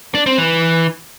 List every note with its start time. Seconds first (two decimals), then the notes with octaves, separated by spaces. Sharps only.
0.15 D4
0.26 C4
0.38 E3